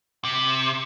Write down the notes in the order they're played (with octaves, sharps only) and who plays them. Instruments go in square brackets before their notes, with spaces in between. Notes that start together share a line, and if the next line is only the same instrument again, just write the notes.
[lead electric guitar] C3